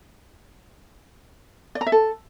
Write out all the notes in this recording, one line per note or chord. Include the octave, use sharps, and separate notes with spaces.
D5
A#5
E5
A4